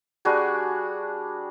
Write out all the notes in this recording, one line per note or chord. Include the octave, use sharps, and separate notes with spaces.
G3 D4 F#4 G#4